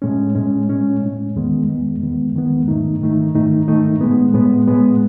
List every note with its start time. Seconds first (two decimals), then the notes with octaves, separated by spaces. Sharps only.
0.02 A2 G#3 C#4
0.35 A2 G#3 C#4
0.69 A2 G#3 C#4
1.02 A2 G#3 C#4
1.36 E2 D#3 G#3 B3
1.68 E2 D#3 G#3 B3
2.02 E2 D#3 G#3 B3
2.35 E2 D#3 G#3 B3
2.68 G#2 D#3 A3 D#4
3.02 G#2 D#3 A3 D#4
3.35 G#2 D#3 A3 D#4
3.68 G#2 D#3 A3 D#4
4.01 A2 G#3 B3
4.34 A2 G#3 B3
4.68 A2 G#3 B3